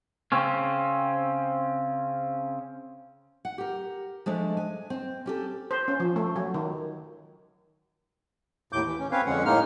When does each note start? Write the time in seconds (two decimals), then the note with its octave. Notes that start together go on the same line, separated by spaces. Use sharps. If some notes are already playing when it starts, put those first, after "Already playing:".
0.32 C#3 C4 C#4
3.45 F#5
3.58 G4 A#4
4.26 F3 G#3 A3 D4
4.57 G#5
4.90 C4
5.26 C#4 G4 A4
5.71 C5
5.88 C#4
6.00 F3
6.16 A3
6.36 F#3
6.54 D#3
8.73 D#2 A2 D6 G6
8.87 E3
8.99 C#4
9.11 C4 C#4 B4 C#5 F5
9.26 F2 D3 G#3 C#4 F#5
9.45 A2 G#3 A#3 D#4 F6